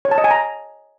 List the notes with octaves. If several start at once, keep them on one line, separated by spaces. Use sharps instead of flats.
C#5
A5
D#5
G#5
A#5